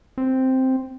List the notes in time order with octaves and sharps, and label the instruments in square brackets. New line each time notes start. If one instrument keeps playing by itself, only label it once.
[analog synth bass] C4